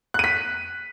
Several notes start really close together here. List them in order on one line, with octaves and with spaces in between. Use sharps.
F#6 D#7 B6